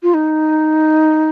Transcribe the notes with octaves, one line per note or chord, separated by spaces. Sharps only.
F4
D#4